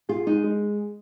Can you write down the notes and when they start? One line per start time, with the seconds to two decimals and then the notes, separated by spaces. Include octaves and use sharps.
0.09 F4 G#4
0.27 G#3 D#4
0.44 G#3